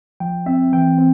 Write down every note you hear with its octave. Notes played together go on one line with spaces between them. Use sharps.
F3 G5
C4 E5
E3 G5
C4